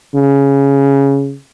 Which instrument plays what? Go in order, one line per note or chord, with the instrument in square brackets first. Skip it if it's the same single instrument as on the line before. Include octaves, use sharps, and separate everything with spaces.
[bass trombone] C#3